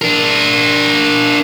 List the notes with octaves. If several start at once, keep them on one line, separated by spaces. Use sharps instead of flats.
D4 A#4